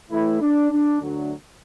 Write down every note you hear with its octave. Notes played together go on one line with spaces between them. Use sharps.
A2 E3 A3 E4
D4
D4
D2 D3 F#3